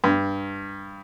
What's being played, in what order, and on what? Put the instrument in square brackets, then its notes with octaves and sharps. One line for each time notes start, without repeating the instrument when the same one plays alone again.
[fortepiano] G2